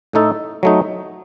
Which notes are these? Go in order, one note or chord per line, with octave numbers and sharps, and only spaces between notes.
A2 A3 D#4 A4
F#3 A3 D#4